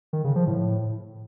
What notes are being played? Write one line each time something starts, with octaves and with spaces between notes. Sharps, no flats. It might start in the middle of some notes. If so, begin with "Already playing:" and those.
D#3
C#3
F3
A2